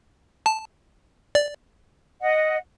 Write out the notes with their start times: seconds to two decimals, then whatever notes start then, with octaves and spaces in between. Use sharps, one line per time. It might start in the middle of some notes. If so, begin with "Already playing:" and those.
0.46 A5
1.35 D5
2.21 D#5 F#5